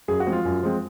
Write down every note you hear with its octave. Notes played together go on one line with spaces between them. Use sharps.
F#2 G#4
F#4
F3 G#3 C4
F4
F#2
F3 G#3 C4